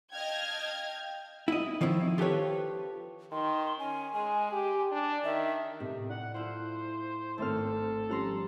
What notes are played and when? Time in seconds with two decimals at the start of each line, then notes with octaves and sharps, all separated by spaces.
0.12 D#5 F5 G5 A5 F6 G#6
1.48 E4 D#5
1.81 D#3 F3 C4 E4
2.18 F4 G4 A4 B4 C#5
3.32 D#3 C6
3.79 C#4 G#5
4.14 G#3 G#5
4.51 G4
4.92 D4
5.24 D#3 E5
5.80 A2 C3
6.10 D5 F#5
6.34 A3 E4 F4 C5
7.38 G#1 A3 C4 A4 C6 F6
8.09 F3 G3 C#4 F#5 A#5 C6